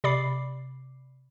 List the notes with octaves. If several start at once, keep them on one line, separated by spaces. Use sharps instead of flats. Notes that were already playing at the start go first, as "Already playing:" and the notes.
C3 D5 B5 D6 C7